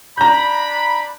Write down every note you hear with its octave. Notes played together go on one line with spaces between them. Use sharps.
D4 A#5 B5 G6